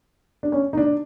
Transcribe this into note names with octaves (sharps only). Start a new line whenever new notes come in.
D4
C#4
D#4
D4